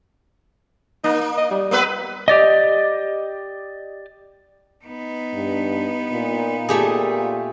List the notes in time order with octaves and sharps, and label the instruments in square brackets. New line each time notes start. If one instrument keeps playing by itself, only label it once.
[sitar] A#3 [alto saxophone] D#4
[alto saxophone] D#5
G3
[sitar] A#3 B3 B4
[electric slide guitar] G4 D5 D#5
[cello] B3 D#4
[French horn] G2
A#2
[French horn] A#2 [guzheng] A3 G4 G#4